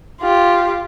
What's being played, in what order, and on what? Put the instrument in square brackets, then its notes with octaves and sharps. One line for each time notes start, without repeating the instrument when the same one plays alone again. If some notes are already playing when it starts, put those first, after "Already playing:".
[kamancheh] F4 G4